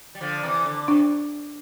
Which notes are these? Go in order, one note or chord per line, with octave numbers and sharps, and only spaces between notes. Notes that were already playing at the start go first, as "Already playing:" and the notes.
G3
D3 F3
C3 E3
D3
C3 D4